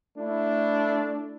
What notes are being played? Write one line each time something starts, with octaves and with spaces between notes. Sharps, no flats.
A3 D4 E4